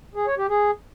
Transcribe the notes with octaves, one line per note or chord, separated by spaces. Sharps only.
G#4
C#5
G4
G#4